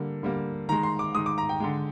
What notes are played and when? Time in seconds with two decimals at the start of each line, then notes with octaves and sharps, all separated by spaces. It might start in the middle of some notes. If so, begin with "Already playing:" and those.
Already playing: D3 G3 A#3
0.23 D3 G3 A#3
0.69 D#3 G#3 A#5
0.83 C6
0.99 D6
1.15 D#3 G#3 D#6
1.26 D6
1.38 A#5
1.49 G5
1.60 D3 G#3